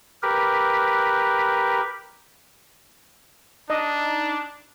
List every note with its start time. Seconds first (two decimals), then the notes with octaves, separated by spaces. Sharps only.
0.23 G4 A#4 B4
3.70 D4 D#4 D#5